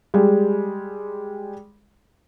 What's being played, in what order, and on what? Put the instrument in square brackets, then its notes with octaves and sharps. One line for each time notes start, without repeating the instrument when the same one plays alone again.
[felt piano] G3 G#3